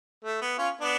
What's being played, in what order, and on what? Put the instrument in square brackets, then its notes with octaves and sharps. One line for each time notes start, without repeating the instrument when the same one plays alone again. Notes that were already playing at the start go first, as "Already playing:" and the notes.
[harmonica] A3
B3
C#4 F4
B3 D4